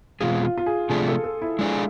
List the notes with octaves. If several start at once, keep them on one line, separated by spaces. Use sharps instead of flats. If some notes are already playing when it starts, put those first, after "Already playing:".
E2 B2 G#3 C4 F4 G#4
F4
F4
G#4
C3 F3 A3 D4 G#4
A4
A4
E4
G#3 D4 G#4